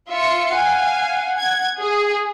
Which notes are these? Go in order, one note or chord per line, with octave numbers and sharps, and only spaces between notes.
F4 E5 C#7
F5 F#5 G#5
G#6
G#4